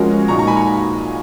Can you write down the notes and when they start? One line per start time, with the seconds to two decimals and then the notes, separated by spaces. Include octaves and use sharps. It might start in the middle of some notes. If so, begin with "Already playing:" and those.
Already playing: F3 G#3 C#4 F#4 A#4
0.28 A#2 G#3 D#4 F#4 A#5 C#6
0.39 A#5 C#6
0.47 G#5 B5
0.57 A#5 C#6